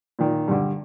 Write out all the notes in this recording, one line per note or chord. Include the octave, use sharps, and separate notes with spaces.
A#2 D#3
G2 D3